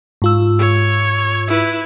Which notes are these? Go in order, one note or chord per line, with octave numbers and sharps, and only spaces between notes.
G#2 F4 E6
C#5
E4 B4